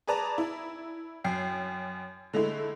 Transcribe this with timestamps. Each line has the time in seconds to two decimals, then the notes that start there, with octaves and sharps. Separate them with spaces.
0.07 G#4 B4 D5 A5 A#5
0.38 E4
1.24 F#2 G5 C7
2.33 D3 G#3 A3 E4